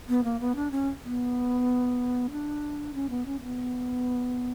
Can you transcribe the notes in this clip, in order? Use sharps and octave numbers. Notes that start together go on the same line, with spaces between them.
B3
A#3
B3
D4
C#4
B3
D4
C#4
B3
C#4
B3